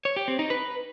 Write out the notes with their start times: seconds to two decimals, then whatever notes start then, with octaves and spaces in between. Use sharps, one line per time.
0.05 C#5
0.16 G4
0.28 C4
0.39 D#4
0.50 B4